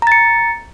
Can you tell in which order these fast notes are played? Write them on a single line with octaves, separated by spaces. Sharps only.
A#5 A6 C#7